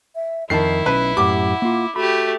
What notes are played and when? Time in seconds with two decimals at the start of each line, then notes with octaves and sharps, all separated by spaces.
0.15 E5
0.50 F2 D#3 E4 A#4 A5 C7
0.86 B1 C#4 B4
1.17 F#2 A2 G4 F#5 D6
1.62 A#3 F4
1.96 A3 F#4 G4 B5